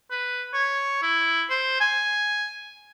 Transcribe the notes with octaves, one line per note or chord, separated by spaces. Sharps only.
B4
C#5
E4
C5
G#5